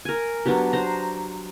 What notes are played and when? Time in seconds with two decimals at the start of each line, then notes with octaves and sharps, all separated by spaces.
0.05 A#4 G#5
0.46 F#3 B3 D4 G4
0.73 C5 A#5